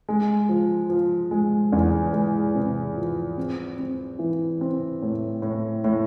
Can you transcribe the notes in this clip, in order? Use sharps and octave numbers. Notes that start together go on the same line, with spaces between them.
G#3
F3
F3
G#3
E2
G#3
C3
F3
C4
C4
E3
C4
A2
A2
A2